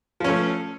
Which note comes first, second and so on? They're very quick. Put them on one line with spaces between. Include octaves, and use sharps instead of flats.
F3 C#4 A3